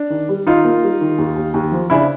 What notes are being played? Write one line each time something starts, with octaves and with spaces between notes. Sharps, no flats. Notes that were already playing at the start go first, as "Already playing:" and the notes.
Already playing: D4
D#3
G3
D#3 D#4 F4
A#3
G3
D#3
D#2
D#2
D#2
F3
C#3 D4 E4